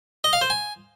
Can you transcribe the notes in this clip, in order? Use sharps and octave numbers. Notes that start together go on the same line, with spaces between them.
D#5
F5
C5
G#5